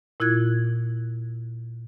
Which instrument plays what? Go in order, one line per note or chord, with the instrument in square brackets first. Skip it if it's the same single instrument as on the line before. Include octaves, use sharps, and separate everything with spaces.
[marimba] A#2 E4 F4 F#6 G#6